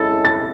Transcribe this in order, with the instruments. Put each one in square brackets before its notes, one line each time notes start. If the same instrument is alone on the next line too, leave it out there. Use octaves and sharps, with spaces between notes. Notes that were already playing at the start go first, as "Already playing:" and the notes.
Already playing: [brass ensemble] G#3 C#4 E4 A4 [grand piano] A6
[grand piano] A6